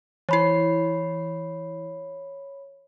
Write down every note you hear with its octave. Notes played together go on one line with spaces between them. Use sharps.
E3 E4 C#5 B5 C7